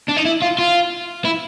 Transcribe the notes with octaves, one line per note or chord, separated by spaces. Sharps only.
D4
D#4
E4
F4
F4
E4